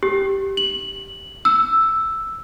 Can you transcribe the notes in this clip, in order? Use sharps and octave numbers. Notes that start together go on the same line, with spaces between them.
G4
F#7
E6